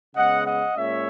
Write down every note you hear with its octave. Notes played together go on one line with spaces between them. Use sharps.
C#3 G#3 B3 D#5 F#5
D#5 F#5
A#2 G#3 C#4 C#5 E5